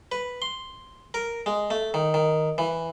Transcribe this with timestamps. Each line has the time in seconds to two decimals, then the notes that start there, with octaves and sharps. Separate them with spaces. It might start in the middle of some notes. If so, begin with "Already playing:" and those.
0.12 B4
0.42 C6
1.14 A#4
1.46 G#3
1.71 A3
1.94 D#3
2.14 D#3
2.58 E3